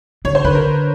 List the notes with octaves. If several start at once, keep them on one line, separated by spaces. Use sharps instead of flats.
D3 C#5
C5
D3 B4
A#4